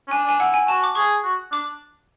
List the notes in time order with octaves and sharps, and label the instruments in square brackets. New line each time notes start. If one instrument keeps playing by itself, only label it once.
[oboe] C#4
[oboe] D4 [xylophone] G#5
[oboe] D4 [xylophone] G#5
[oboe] E4 [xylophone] F#5
[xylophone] G#5
[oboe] F#4 [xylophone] A5
[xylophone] D6
[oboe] G#4 [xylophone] C#6
[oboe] F#4
[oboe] D4 [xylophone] D6